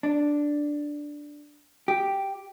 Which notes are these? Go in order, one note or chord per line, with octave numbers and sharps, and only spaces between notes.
D4
G4